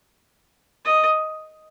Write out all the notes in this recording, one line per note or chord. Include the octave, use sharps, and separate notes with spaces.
D#5